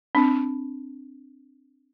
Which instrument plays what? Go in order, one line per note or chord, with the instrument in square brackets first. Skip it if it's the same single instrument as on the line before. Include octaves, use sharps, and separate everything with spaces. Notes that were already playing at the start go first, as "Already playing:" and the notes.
[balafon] C4 D4